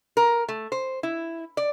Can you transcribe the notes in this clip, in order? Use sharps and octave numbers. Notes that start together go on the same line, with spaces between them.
A#4
A3
C5
E4
D5